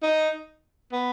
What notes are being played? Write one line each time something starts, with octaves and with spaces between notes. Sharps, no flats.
D#4
B3